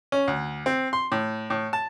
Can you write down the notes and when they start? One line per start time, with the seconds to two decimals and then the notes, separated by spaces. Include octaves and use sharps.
0.12 C#4
0.28 D2
0.66 C4
0.93 C6
1.12 A2
1.50 A2
1.73 A5